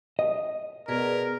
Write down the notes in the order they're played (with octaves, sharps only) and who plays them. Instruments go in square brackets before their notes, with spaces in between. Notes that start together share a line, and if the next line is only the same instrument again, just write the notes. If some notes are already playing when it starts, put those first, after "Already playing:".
[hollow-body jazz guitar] D#5
[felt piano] B2 [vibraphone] G#4 B4 D5 [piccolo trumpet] A#4